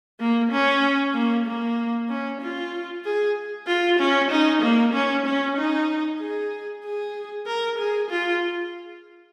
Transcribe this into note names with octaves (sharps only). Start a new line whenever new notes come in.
A#3
C#4
A#3
A#3
C#4
F4
G#4
F4
C#4
D#4
A#3
C#4
C#4
D#4
G#4
G#4
A#4
G#4
F4